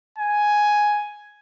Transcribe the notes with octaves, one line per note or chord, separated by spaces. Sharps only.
G#5